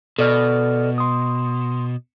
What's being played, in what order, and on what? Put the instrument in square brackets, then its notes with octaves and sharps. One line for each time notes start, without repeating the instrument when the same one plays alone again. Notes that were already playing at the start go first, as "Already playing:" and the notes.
[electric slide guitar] B2 [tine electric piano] A4 D5 F6
[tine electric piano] C6 D#6